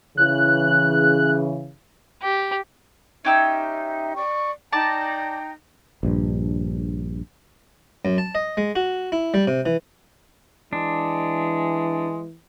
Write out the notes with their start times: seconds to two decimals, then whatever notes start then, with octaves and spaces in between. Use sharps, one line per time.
0.17 C#3 E3 F#6
2.22 G4
3.25 C#4 D#4 G4 E5 E6
4.15 D5 C#6
4.72 D#4 D5 G5 A5 A#5
6.03 A#1 G2
8.05 F#2
8.18 A5
8.35 D#5
8.57 G#3
8.75 F#4
9.12 E4
9.34 G3
9.47 C3
9.66 E3
10.73 E3 G#3 D4